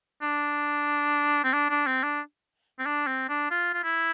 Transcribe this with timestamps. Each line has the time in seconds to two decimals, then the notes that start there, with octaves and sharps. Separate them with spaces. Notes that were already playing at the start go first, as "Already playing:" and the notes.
0.22 D4
1.44 C4
1.54 D4
1.70 D4
1.87 C4
2.03 D4
2.79 C4
2.86 D4
3.07 C4
3.29 D4
3.51 F4
3.74 F4
3.84 E4